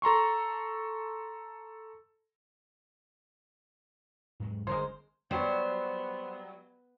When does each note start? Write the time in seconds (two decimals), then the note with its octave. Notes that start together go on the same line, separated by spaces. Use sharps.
0.02 A4 A#5 C6 C#6
4.40 G#2 F#3 G#3
4.67 G1 C#3 G#3 A#4 C5
5.31 F#3 G3 B3 C5